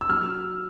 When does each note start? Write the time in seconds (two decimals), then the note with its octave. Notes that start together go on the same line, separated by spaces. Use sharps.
0.01 E6
0.09 F#3 F6